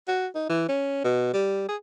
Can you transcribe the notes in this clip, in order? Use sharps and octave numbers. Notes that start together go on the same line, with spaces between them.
F#4
D#4
E3
C#4
B2
G3
G#4